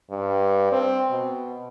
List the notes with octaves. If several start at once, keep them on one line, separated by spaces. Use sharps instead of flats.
G2
C4
B2